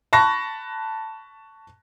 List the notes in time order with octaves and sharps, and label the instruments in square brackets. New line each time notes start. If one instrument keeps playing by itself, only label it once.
[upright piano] A5 B5 C#6 F#6 A#6